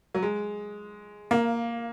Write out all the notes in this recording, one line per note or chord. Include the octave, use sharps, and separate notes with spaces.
F#3
G#3
A#3